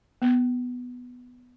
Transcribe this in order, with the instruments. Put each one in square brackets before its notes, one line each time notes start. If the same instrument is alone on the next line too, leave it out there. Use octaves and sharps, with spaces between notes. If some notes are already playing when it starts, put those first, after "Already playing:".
[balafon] B3